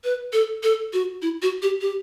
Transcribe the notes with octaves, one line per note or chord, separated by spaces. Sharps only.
B4
A4
A4
F#4
E4
F#4
G4
G4